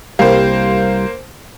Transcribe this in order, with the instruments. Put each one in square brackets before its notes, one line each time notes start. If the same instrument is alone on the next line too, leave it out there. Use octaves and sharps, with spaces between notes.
[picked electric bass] C2 G3 [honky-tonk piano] A#3 C5